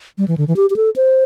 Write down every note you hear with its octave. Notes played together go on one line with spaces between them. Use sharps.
G3
E3
D3
E3
G4
G4
A4
C5